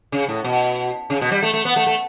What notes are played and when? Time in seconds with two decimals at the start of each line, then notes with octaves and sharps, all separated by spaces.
0.12 C#3
0.28 A2
0.44 B2
1.10 C#3
1.21 B2
1.31 G3
1.43 A3
1.53 A3
1.65 B3
1.76 A3
1.86 A3